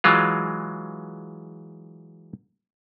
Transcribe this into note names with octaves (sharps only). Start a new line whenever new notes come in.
E3 F#3 G#3 F4